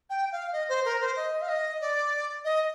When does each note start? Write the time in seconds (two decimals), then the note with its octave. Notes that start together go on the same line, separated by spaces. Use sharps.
0.10 G5
0.32 F5
0.52 D#5
0.69 C5
0.85 A#4
1.00 C5
1.16 D#5
1.41 F5
1.49 D#5
1.81 D5
2.44 D#5